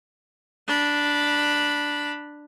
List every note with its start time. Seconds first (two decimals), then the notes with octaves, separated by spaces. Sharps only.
0.68 D4 B5